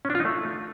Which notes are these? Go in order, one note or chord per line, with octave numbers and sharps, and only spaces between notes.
C#4
D4
F4
D#4
A3